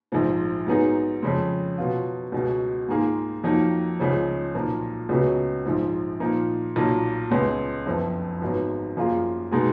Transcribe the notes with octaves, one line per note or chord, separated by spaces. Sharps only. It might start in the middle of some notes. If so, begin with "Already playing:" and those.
A#1 G#2 F3
G#2 F#3 B3 D#4 G#4
F2 C#3 G#3
B2 F#3 B3 F4
C#2 B2 F#3
G#2 D#3 A#3 F4 G#4
F2 D#3 F#3 A#3 D#4
C#2 C#3 F3
B1 A#2 F3 A#3
C#2 C#3 F#3 B3 F#4
A#1 G#2 F3
A#2 F3 A#3 D#4
B1 A#2 F#3 A#3
C#2 C#3 G#3 B3
F#1 F2 F3 B3
G#1 G#2 F#3 B3
F#2 F3 A#3 F4 G#4
B2 G#3 D#4 G#4